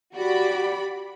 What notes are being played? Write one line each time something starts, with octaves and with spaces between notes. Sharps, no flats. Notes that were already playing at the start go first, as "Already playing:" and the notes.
F#4 G4 D5 B5